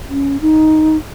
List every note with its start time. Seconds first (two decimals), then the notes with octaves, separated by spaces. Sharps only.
0.09 C#4
0.41 D#4